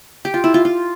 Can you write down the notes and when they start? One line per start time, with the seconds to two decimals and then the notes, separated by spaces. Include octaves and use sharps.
0.25 G4
0.34 F4
0.44 E4
0.54 F4
0.65 F4